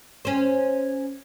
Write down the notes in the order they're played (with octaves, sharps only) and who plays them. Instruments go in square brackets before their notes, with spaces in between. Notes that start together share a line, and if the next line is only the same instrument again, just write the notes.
[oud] C#4 C5